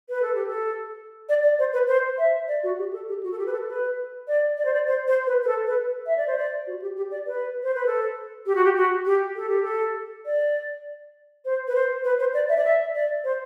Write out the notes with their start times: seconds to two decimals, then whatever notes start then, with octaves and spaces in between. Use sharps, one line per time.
0.09 B4
0.22 A4
0.35 G4
0.47 A4
1.29 D5
1.43 D5
1.59 C5
1.73 B4
1.88 C5
2.18 E5
2.48 D5
2.63 F#4
2.78 G4
2.93 A4
3.08 G4
3.23 F#4
3.32 A4
3.38 G4
3.46 B4
3.53 A4
3.67 B4
4.28 D5
4.58 D5
4.65 C5
4.74 D5
4.87 C5
5.08 C5
5.27 B4
5.43 B4
5.47 A4
5.67 B4
6.06 E5
6.17 D5
6.27 C5
6.37 D5
6.67 F#4
6.82 G4
6.97 G4
7.11 D5
7.27 B4
7.63 C5
7.74 B4
7.86 A4
8.46 G4
8.55 F#4
8.64 G4
8.76 F#4
9.06 G4
9.36 A4
9.49 G4
9.63 A4
10.26 D5
11.45 C5
11.68 B4
11.75 C5
12.04 B4
12.20 C5
12.34 D5
12.49 E5
12.57 D5
12.64 E5
12.95 D5
13.24 C5